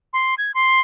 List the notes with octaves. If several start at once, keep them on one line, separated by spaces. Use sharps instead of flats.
C6
G#6
C6